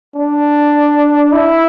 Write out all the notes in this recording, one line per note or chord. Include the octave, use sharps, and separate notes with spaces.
D4
E4